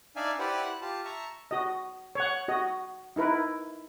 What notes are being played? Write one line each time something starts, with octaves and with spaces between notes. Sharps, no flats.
D4 D#4 D5 E5 F5 G#5
E4 G4 B4 C5 D5 F#5
F#6
F4 G4 A5
E5 A5 A#5 C#6
F#4 D#5
C#5 F#5
F#4 D#5
D#4 E4 A#4 B4